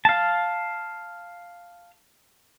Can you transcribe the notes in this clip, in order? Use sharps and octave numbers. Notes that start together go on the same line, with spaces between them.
F5 A5